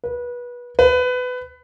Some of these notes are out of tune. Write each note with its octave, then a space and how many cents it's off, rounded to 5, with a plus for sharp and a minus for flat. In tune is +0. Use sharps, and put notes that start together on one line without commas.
B4 -25
B4 +20